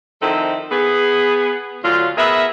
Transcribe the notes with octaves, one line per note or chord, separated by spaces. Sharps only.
D#3 F3 C4 E4 A4
B3 G#4
D2 D3 F#3 F4
B3 G#4 A#4 E5